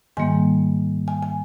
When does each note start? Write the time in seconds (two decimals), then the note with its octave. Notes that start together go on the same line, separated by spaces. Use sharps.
0.17 G#2 D#3 G3 A#3 G#5
1.08 G#5
1.23 G#5